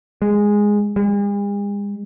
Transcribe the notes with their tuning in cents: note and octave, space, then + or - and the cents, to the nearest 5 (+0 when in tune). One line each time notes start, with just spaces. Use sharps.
G#3 -5
G#3 -45